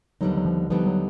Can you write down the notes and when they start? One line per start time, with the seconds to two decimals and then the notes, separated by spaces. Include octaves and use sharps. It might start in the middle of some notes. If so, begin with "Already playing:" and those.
0.21 D#2 D3 F#3 G3 B3 D#4
0.37 F#3
0.45 F3
0.70 D#2 D3 F3 G3 B3 D#4
0.87 F#3